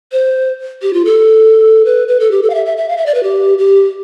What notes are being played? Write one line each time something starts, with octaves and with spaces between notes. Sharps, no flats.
C5
G4
F4
A4
B4
B4
A4
G4
A4
F5
E5
E5
E5
F5
E5
D5
B4
G4
G4